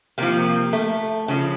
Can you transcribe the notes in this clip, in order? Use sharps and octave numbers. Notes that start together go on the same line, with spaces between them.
C3 F3 A#3
A3
C#3 F3